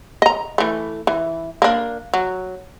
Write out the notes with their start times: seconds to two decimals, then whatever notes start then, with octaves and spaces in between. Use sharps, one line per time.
0.22 D#5 A#5
0.58 E3 A3
1.07 E3
1.62 A#3 D4
2.14 F#3